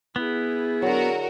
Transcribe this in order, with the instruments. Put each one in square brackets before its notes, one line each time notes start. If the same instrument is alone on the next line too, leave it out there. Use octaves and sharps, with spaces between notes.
[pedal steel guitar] B3 [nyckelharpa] E4 G#4
[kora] D3 F#3 [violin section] F#4 A#4